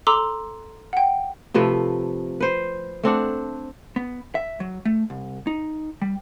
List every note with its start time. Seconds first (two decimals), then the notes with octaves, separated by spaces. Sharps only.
0.07 A4 A#5 C6 D6 E6
0.93 F#5 G5
1.54 C3 F3 A3 B4
2.40 B4 C5
3.03 A3 C4 D4 F#5
3.96 B3
4.35 E5
4.60 F#3
4.85 A3
5.10 C2
5.47 D#4
6.02 G3